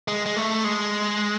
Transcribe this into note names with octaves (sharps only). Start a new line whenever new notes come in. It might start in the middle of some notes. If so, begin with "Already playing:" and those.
G#3
G#3
A3
G#3